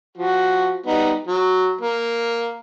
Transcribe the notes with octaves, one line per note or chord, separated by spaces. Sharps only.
F3 F#4
G3 B3 D#4
F#3
A#3